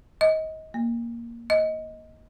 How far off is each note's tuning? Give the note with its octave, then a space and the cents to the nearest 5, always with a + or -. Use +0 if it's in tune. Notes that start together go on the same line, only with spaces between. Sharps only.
D#5 +25
A#3 +5
D#5 +15